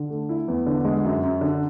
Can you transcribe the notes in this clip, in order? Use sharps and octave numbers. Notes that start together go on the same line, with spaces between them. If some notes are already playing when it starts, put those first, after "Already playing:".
Already playing: D3
A3
E4
E2
D3
G#3
F#2
F#2
D3